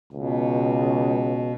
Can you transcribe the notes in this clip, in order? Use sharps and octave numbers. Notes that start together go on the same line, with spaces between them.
C#2 B2